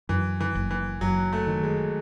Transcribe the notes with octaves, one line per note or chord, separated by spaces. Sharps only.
F#2 E3
E3
F#1
E3
F#1 F#3
A3
D#3
G#3